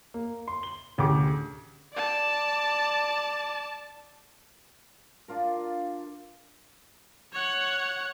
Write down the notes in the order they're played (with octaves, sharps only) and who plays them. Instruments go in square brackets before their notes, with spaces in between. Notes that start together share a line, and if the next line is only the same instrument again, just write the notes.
[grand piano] A#3
C6
G7
A1 D2 G4 G#4 D6
[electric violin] D5 A5
[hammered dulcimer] D4 F4 A#4
[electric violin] C#5 F#5